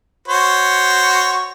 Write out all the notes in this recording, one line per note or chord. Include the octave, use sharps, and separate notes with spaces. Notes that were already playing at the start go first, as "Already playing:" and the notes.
F#4 C5 C#5